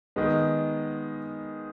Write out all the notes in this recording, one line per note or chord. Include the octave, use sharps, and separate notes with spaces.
D#3 G#3 B3